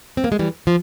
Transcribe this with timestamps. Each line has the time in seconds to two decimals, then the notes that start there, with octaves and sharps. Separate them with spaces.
0.17 C4
0.24 A#3
0.32 G#3
0.39 E3 G3
0.67 F3